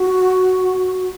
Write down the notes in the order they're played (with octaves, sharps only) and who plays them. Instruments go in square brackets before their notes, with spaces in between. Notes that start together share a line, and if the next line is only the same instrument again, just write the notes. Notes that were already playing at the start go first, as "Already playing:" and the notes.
Already playing: [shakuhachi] F#4